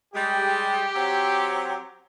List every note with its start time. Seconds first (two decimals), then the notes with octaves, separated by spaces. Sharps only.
0.14 G3 G#3 G4
0.95 F#3 C4